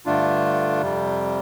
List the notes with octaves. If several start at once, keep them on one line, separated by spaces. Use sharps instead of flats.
G2 D3 A3 D4 F4
F2 C3 G3